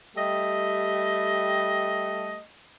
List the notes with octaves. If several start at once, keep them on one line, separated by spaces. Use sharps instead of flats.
G3 A3 G4 D#5